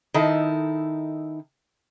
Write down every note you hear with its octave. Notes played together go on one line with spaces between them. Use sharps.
D#3 D#4 E4 A4